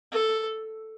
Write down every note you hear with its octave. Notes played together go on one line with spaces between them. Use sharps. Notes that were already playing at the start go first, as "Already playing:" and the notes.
A4